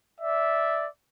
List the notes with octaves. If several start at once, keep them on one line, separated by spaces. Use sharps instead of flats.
D5 E5